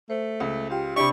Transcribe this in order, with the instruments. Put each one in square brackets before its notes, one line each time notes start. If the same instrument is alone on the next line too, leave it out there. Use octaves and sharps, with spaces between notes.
[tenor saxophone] A3 [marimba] C5
[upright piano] C#2
[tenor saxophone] F4 [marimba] G4 G5
[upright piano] C3 D4 [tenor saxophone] G4 [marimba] E5 B5 [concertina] C#6